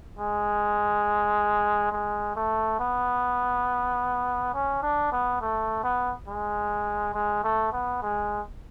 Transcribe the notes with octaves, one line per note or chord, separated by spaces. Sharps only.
G#3
G#3
A3
B3
C#4
D4
B3
A3
B3
G#3
G#3
A3
B3
G#3